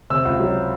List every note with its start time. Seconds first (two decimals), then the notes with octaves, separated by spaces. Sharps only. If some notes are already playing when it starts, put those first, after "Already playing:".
0.10 C3 E6
0.25 C#2
0.40 F#3